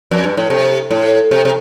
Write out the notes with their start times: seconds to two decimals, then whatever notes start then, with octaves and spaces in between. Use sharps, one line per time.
0.11 F2
0.24 G2
0.37 A2
0.50 C3
0.91 A2
1.31 C3
1.45 C3